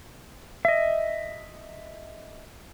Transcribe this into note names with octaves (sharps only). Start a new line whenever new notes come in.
D#5 E5